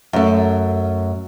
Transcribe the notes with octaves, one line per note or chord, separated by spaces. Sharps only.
F#2 A3